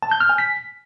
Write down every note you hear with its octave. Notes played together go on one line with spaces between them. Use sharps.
A5
G6
F6
G#5
B6